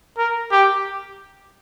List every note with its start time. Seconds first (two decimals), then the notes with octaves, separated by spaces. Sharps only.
0.18 A#4
0.52 G4